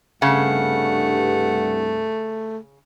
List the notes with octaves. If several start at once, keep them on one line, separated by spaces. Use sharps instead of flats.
C2 G2 C#3 A3 F#5